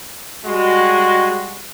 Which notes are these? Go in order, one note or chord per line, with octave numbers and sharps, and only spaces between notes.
G3 G#3 F#4